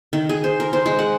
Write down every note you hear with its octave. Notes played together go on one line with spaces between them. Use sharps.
D#3
G#4
C5
A#4
C5
G#3
F#5